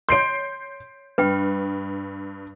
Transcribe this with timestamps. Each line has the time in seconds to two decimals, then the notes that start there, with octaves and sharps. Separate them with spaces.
0.09 C#5 C6 G6 C7 D7
1.18 G2 B4 G5